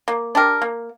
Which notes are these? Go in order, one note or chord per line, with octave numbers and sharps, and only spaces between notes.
A#3
D4 G4 A#4
A#3